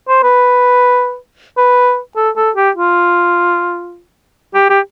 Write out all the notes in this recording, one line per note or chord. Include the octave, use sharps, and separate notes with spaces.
C5
B4
B4
A4
A4
G4
F4
G4
G4